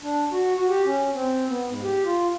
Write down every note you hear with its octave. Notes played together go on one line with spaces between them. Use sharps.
D4
F#4
F#4
G4
C#4
C4
B3
G#2
G4
F4